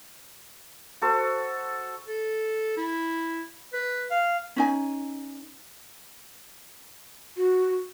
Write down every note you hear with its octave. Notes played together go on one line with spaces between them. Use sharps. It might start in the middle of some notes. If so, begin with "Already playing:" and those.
F#4 A4 C5
A4
E4
B4
F5
C#4 D#4 G#5
F#4